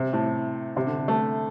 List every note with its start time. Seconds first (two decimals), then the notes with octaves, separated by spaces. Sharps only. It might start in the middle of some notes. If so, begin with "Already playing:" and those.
Already playing: C3
0.13 A2
0.77 C3
0.87 D3
0.98 D3
1.08 A3